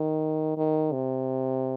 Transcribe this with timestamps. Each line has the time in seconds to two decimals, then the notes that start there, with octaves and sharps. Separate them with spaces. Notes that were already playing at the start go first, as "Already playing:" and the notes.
Already playing: D#3
0.57 D#3
0.92 C3